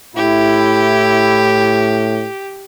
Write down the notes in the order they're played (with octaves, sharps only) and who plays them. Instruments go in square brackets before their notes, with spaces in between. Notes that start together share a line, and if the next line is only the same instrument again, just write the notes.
[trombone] A2 [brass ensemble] E4 [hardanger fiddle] G4